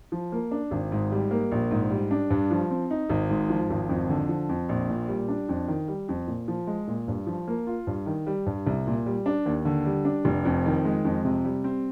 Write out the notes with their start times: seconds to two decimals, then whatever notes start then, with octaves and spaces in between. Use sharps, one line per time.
0.12 F3
0.32 A#3
0.51 D4
0.71 G#1
0.92 G#2
1.12 G3
1.31 A#3
1.52 A#1
1.71 G#2
1.91 G3
2.11 D4
2.30 G2
2.51 F3
2.71 C4
2.91 D#4
3.09 G#1
3.30 G#2
3.50 F3
3.70 G#1
3.89 F2
4.09 D3
4.29 F3
4.49 F2
4.69 A#1
4.89 A#2
5.08 G3
5.28 D4
5.49 F2
5.68 D#3
5.88 G3
6.09 F2
6.27 A#2
6.48 F3
6.67 G#3
6.87 A#2
7.08 G2
7.27 F3
7.48 A#3
7.67 F4
7.87 G2
8.06 D#3
8.27 G3
8.46 G2
8.67 C2
8.87 A#2
9.06 G3
9.26 D4
9.46 D#2
9.65 D3
9.85 G3
10.05 D4
10.25 F1
10.45 F2
10.66 D#3
10.85 G#3
11.05 F2
11.24 C3
11.45 G3
11.64 C4